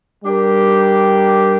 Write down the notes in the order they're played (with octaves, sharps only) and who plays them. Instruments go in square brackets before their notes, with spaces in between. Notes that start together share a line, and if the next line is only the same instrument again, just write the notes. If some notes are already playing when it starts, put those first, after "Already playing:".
[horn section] G3 D4 G4 A#4